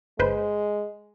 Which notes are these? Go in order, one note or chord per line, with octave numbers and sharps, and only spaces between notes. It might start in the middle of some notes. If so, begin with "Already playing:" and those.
G1 G#3 B4 C5